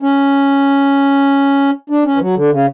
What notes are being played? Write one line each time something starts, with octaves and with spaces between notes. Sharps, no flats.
C#4
D4
C#4
E3
F#3
D3
C#3